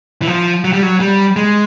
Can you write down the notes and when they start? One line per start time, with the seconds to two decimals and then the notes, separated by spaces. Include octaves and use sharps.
0.22 E3
0.27 F3
0.64 F#3
0.73 G3
0.83 F#3
1.00 G3
1.36 G#3